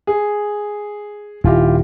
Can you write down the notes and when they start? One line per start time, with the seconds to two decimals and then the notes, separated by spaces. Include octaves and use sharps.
0.07 G#4
1.44 D#1 D#3 E4 F4 G4